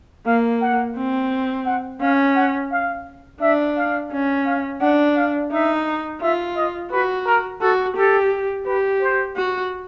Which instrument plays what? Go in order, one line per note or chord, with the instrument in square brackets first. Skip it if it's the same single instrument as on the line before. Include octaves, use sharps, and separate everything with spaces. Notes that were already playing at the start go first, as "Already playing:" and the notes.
[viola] A#3 [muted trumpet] F5
[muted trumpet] F#5
[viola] C4
[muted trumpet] F#5
[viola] C#4 [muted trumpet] F5
[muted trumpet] F#5
F5
[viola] D4 [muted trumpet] E5
[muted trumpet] F5
[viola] C#4
[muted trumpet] F5
[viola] D4 [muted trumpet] F#5
[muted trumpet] F5
[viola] D#4 [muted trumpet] E5
[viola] F4 [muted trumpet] E5
[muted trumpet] D#5
[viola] F#4 [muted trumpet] B4
[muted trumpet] A#4
[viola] F#4 [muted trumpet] A4
[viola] G4 [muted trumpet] A4
[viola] G4 [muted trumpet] B4
[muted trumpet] C5
[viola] F#4